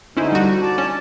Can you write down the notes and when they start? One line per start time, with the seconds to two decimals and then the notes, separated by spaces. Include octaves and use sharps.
0.17 D3 C#4 D#4 E4 C5
0.32 G3 F#4
0.62 D5 A5
0.78 C#4